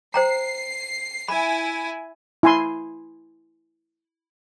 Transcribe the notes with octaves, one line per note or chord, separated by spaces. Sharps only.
C5 G5 A#5 C7
E4 G#5 B5
E4 G#5 C6